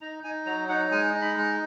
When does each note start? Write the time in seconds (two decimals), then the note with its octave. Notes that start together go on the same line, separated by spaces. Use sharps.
0.01 D#4 A#5
0.24 D#4 G#5
0.46 F#3 A#5
0.69 D#4 F#5
0.92 G#3 G#5
1.14 D#4
1.22 B5
1.37 G#3